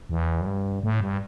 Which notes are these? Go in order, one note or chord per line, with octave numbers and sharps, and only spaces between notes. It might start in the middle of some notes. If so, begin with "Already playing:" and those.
E2
F#2
G2
A2
G2